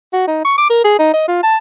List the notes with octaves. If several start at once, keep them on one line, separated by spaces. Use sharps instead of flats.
F#4
D#4
C#6
D6
A#4
G#4
D#4
D#5
F4
A5